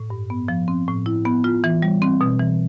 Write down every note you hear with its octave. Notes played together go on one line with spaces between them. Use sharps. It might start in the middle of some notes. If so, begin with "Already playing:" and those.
Already playing: A2
G2
B3
F3
C4
A2
E4
B3
F4
E3
G3
C4
B2
E3